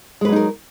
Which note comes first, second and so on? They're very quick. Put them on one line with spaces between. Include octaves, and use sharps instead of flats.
G#3 B4 F#3 D#4 A#4